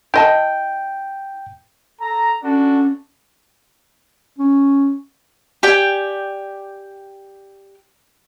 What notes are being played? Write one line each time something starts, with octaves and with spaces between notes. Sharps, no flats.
E4 D#5 G5 A5
A4 A#5
C#4 D4 F#4 A4
C#4
G4 D5 G5 G#5